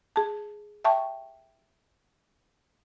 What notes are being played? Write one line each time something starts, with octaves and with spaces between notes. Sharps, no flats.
G#4 A5
E5 G5 A5 C#6